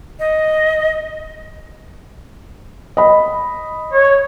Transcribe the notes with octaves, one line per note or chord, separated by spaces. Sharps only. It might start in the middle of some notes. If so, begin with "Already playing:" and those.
D#5
D#5 B5
C#5